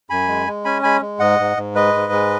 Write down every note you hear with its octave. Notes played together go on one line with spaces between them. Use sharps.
F#2 G#5 B5
G#3
G#3
C#4 G#5 B5
G#3 G#5 B5
G#3
G#2 D#5 F#5
G#2
G#2
G#3 B4 D#5
G#2
G#3